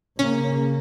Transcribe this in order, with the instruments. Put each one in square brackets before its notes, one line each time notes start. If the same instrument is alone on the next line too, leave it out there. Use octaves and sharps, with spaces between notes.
[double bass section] C#3 A#3 [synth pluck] C#4